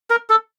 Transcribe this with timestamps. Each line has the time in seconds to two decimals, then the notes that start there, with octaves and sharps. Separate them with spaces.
0.10 A#4
0.30 A4